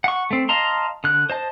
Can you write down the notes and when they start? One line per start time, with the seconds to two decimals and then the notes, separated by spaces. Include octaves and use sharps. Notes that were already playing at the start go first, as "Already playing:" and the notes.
0.04 F#5 C#6
0.31 A3 C4
0.49 D#5 F5 A5 A#5 C6
1.04 D3 F#6
1.30 C5 D#5 A5